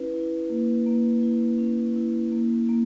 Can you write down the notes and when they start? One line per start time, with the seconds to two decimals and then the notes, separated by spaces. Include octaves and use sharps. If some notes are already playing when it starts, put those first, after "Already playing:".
Already playing: C#4 E4 B4
0.14 E4
0.49 A#3
0.86 A#3
1.23 E4
1.59 C#4
1.96 E4
2.32 A#3
2.69 A#3